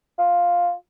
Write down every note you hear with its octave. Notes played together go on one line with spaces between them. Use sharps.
F4